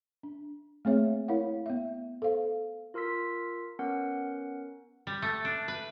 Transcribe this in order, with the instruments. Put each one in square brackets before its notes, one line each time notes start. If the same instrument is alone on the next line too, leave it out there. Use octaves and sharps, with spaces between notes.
[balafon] D4
A3 A#3 C4 G#4 C#5 E5
E4 A#4 C#5 F5 F#5
B3 E5
A4 C5 F5
[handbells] F4 A#4 C6 E6 B6
B3 C#4 A#4 F#5
[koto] G3
A3
D4
B4